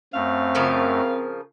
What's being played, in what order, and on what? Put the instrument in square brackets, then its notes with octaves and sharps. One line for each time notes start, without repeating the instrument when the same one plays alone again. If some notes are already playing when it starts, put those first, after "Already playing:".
[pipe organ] F#2 A3 [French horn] C4 [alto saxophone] F5
[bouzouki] C#3 F3 A#4